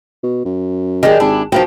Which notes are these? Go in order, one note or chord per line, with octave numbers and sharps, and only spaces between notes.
B2
F#2
D#3 D4 G4 G#4
G#1 D4 E4
B1 F3 A#3 B3 F#4 G5